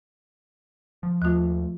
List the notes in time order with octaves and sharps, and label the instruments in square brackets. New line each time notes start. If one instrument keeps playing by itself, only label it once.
[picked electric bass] F3
[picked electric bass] D#2 A3 [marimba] F3 F4